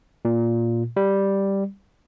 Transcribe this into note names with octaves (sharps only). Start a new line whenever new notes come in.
A#2
G3